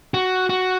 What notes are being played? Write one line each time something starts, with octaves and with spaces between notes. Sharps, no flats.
F#4
F#4